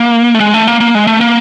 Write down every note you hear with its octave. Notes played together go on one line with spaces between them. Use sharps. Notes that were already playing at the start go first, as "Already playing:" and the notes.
Already playing: A#3
A3
G#3
A3
A#3
A#3
G#3
A3
A#3